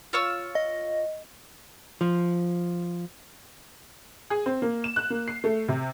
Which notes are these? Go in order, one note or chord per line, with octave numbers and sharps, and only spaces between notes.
F4 C#5 E6
D#5
F3
G#4
C4
A#3
E7
F#6
A#3
C7
A3
C3